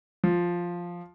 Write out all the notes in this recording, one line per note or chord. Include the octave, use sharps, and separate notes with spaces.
F3